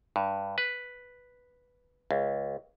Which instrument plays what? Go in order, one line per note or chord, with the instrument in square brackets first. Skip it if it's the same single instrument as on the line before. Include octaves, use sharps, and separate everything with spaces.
[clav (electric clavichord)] G2
B4
C#2